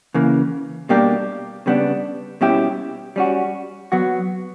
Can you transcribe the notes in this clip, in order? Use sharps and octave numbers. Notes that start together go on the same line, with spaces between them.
C#3 E3 A#3
B2 G3 A#3 D4 G4
C#3 G3 B3 D4
B2 G3 C#4 E4 G4
G3 C#4 F#4
F#3 B3 F#4